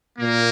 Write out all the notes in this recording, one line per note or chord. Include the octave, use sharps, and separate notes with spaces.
A#2 A#3